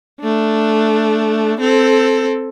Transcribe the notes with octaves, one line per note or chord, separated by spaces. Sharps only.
A3 D4
C4 A4